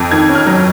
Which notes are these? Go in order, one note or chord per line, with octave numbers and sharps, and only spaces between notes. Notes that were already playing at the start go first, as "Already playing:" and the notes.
Already playing: F2
D#3 G#6
C#4
F6
F#3